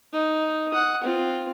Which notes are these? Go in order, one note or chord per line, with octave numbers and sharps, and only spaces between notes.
D#4
F#5 D#6
C4 F4